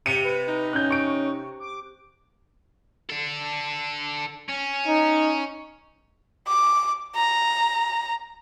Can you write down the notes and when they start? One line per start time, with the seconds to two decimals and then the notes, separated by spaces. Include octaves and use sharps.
0.06 C3 C#7 D#7
0.24 B4
0.48 D#4
0.73 C#4 F#6 G6
0.91 C#6 D7
1.60 D6
3.10 D4 A4
4.49 C#4
4.88 D#4
6.47 D6
7.16 A#5